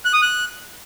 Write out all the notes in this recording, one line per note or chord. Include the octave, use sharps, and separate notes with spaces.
F#6
D#6
F#6